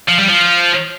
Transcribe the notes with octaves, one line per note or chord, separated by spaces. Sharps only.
F3
G3
F3